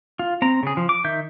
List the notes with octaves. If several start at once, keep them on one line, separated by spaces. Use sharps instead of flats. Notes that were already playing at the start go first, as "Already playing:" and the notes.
F4
C4 A#5
C#3 G#4
F3
D6
D#3 E5 G6